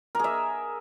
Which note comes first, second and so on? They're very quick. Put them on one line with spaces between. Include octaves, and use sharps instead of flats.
A#4 G#4 E5